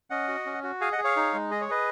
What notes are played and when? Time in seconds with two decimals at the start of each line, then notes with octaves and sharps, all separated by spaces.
0.10 C#4 D#5 F#5
0.28 F#4
0.46 C#4
0.63 F#4
0.81 G#4 F5 G#5
0.92 D#5 F#5
0.98 G#4
1.04 C#5 F5
1.16 D#4
1.34 G#3
1.51 G#4 D#5
1.61 C#5
1.69 G#4 B4 D#5